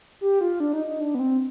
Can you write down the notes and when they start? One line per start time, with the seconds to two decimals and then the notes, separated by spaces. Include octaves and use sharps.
0.21 G4
0.41 F4
0.60 D4
0.73 D#4
0.87 D#4
1.00 D4
1.15 B3
1.19 C4